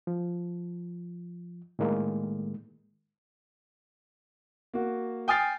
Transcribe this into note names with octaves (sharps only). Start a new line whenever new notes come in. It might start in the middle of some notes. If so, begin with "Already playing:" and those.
F3
A2 D#3 G#3 A#3
A#3 F#4
G5 G#5 D#6 F6 A6 C7